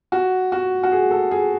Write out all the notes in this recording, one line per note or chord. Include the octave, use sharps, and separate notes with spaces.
F#4
F#4
F#4
G#4
A4
G#4